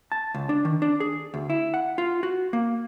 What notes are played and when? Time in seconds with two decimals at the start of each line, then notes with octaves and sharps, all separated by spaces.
0.12 A5
0.34 C#2
0.49 D4
0.65 D#3
0.82 D4
1.00 G#4
1.34 D2
1.50 E4
1.74 F#5
1.98 F4
2.23 F#4
2.53 A#3